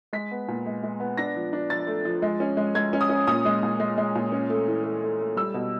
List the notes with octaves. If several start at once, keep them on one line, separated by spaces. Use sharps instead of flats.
G#3 B6
B3
A#2
G#3
G#3
B3
D4 A#6
F3
D4
F3 A6
A3
F3
G#3
C#4
G#3
G#3 G#6
C#4
D#6
C#4
A#2 D#6
G#3
A#2
G#3
G#3
A#2
C#4
A3
E3
A3
A3
A3
G3 E6
B2